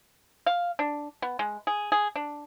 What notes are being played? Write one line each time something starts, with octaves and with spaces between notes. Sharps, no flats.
F5
D4
B3
G#3
G#4
G#4
D4